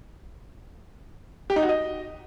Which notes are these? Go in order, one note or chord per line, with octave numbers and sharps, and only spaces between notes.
G4
D#4
F#4
D#5